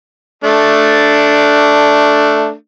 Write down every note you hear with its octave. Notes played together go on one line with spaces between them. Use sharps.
A3 D4